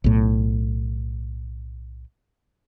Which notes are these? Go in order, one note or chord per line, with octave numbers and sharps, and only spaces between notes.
B1 A2